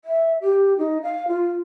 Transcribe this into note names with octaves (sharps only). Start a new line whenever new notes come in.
E5
G4
D#4
F5
F4